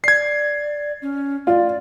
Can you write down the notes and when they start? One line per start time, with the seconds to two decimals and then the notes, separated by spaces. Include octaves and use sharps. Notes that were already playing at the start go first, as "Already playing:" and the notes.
0.04 D5 G#6 C7
1.02 C#4
1.47 F4 D5